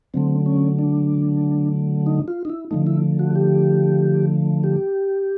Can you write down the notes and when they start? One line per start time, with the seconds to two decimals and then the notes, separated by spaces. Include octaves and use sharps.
0.14 D3 F#3 A3 C4
0.46 C#4
0.79 D4
2.06 D#4
2.28 F4
2.45 D#4
2.50 E4
2.71 D3 F3 A3 D#4
2.87 E4
3.19 F#4
3.36 G4
4.64 G4